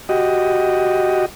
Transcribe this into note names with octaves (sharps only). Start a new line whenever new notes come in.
F#4 G4 D#5